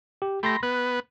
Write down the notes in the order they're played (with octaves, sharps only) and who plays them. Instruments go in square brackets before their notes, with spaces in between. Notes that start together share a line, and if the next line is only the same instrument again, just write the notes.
[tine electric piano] G4
[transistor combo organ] A3 G4 [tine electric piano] B5 C6 A#6
[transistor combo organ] B3 B4 [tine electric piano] F#6